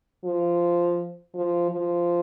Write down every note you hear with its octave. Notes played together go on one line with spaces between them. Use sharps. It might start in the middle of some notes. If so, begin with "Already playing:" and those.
F3
F3
F3